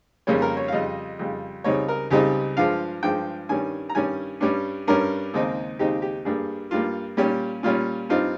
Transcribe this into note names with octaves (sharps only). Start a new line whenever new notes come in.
F2 C#3 G3 A#3 C#4
A#4
C#5
F5
F2 C#3 G3 D#5
F2 C#3 G3
C#2 C#3 G3 C4 D#4 C#5
A#4
C#2 C#3 G3 C4 D#4 G4
G2 F3 G#3 F5
G2 F3 G#3 G5
G2 D#3 G3 C#4 G#5
A#5
G2 D#3 G3 C#4 G#5
G2 G3 C#4
G2 G3 C#4 A#4
D#2 C#3 G#3 C4 D#4
D#2 C#3 G#3 C4 D#4 G4
G4
G2 G3 A#3 G#4
G2 G3 A#3 F4
A#2 G3 C#4 G4
A#2 G3 C#4 F4
G2 G3 C4 D#4 F4